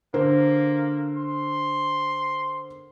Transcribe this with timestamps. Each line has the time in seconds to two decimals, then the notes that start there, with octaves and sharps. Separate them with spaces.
0.14 D3 A#3 A#4 C5
1.17 C6